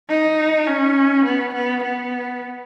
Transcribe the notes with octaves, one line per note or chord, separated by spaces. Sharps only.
D#4
C#4
B3
B3
B3